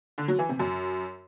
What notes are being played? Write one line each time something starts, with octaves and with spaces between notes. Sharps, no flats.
D3
F#3
E3
C3
F#2